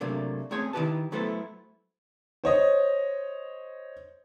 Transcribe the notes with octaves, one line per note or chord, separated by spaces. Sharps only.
C3 F#3 A3 A#3 D4
A3 C4 C#4 G#4 C#5 G#5
D#3 E4 F#4 G4 B4 A5
F#3 A3 B3 E4 A4 C5
C5 C#5 D#5